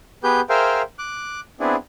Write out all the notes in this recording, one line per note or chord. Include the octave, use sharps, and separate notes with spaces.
B3 G4 G#4 B4 G6
G#4 A#4 C5 E5 F5 G5
D6 F#6
B3 C4 D4 E4 G#4